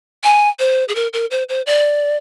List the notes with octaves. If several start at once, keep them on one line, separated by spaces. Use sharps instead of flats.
G#5
C5
G#4
A#4
A#4
C5
C5
D5